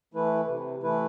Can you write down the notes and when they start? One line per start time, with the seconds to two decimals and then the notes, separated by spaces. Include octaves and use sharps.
0.14 E3 A3 E4 B4
0.48 C3
0.83 E3 A3 E4 B4